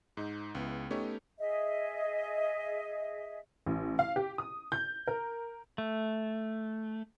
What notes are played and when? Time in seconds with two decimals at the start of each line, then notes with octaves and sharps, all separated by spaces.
0.17 G#2 D#4
0.55 C#2 B3 E4
0.90 A3 B3 C#4 D#4 G4 C#5
1.38 G#4 D#5 E5
3.66 A1
3.99 F5
4.16 G4
4.38 D#6
4.72 G6
5.07 A#4
5.78 A3